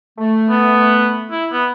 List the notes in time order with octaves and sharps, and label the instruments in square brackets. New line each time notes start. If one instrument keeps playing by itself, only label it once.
[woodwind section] A3
[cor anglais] B3
E4
B3